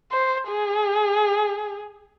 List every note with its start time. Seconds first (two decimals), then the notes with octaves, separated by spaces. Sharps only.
0.12 C5
0.49 G#4